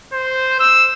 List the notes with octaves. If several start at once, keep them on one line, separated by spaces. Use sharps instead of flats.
C5
E6